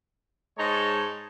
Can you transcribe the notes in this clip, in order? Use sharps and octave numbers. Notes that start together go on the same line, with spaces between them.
G#2 G#3 D#4 C#5 A5